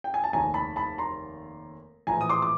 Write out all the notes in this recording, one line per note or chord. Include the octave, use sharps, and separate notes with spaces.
G5
G#5
A5
F1 D#2 D#3 G#5 A#5
A5 B5
A5 B5
A#5 C6
A#1 A2 E3 G#5 A#5
D#6
C6 D6
D6